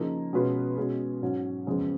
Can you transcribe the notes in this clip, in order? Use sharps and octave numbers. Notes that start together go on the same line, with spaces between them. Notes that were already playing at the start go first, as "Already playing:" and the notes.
Already playing: C#3 F3 A#3 D#4 G#4
B2 G#3 C#4 F4 B4
B2 G#3 C#4 G#4
G#2 F#3 C#4
F#1 F2 C#3 G#3 B3